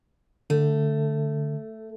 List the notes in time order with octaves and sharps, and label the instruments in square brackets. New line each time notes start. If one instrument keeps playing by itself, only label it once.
[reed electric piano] D3 [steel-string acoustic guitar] A3